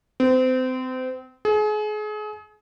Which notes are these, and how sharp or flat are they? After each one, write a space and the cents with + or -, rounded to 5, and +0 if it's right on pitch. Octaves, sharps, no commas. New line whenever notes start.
C4 -30
G#4 +35